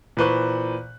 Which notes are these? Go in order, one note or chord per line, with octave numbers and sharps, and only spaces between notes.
A#2 E3 B4 C5 C#6 F#6